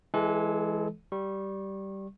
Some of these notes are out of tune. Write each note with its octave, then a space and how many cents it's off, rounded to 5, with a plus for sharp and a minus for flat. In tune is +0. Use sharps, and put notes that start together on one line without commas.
E3 +0 G#3 +5 A4 -30
G3 -10 C#6 -30